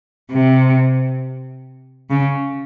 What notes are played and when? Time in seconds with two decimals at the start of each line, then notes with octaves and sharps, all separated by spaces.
0.32 C3
2.10 C#3